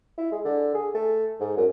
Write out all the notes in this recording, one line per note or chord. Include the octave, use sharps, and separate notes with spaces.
E4
G#3
D3
G#4
A3
G#2
F#2